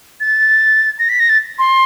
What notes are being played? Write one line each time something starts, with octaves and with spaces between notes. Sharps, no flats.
A6
A#6
B6
A#6
A6
C6